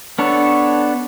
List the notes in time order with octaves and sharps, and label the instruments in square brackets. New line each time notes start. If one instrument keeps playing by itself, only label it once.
[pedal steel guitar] B3 D4 A4 C#5